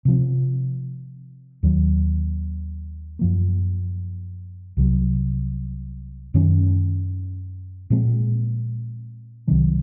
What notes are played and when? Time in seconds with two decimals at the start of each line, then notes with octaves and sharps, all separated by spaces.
0.05 C3 F3 C4
1.63 D#2 D#3 F#3
3.19 F#2 F3 A#3
4.77 C2 C3 D#3 F#3
6.34 F#2 D#3 G#3 C#4
7.90 A#2 F3 G#3 C4
9.47 C2 C3 D#3 F#3